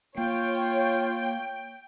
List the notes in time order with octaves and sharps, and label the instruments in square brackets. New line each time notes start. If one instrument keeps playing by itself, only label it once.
[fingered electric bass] A#3 [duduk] F4 [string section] C#5 [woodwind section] G5